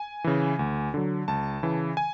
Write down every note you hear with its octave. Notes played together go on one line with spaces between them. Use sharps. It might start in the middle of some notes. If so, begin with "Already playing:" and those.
Already playing: G#5
C#3 E3
D2
D3 F#3
C#2 A5
C#3 E3
G#5